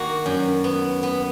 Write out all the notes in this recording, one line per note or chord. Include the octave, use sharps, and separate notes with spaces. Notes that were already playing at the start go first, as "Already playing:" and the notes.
Already playing: D#3 A#3 F#4
F#2
B3
B3